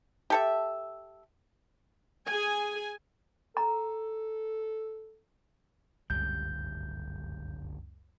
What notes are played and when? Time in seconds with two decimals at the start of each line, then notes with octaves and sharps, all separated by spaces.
0.30 G4 A4 E5
2.27 G#4 G#5
3.57 A4 A#5
6.10 D1 G1 C#2 F#2 G3 G6